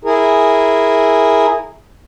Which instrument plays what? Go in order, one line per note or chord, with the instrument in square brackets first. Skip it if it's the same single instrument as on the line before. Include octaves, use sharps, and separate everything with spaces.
[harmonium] E4 G#4 A#4